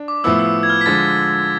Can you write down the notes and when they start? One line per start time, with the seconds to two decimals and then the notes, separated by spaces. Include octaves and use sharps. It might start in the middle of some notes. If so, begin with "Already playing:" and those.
Already playing: D4
0.08 D6
0.24 A2 F3 B3 E4 E6
0.39 E6
0.63 G#6
0.70 F6
0.81 B6
0.86 D3 F3 G#3 A6